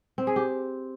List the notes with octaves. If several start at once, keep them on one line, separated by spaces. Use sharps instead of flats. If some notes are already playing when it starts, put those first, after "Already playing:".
C4
G#4
G4